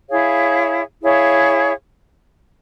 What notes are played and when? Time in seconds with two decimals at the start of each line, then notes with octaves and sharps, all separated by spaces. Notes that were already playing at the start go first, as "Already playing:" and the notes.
0.10 E4 G#4 C#5 F5
1.00 E4 G#4 C#5 F5